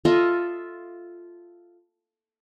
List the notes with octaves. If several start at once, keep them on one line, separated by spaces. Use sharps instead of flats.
F4 A4 D#5 E5